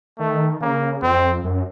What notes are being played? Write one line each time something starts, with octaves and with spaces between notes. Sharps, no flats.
D#3 A3
C#3 A#3
F2 C4
F#2